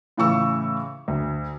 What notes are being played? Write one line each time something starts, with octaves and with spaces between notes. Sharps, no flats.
A2 C#3 E3 C#6 E6
D2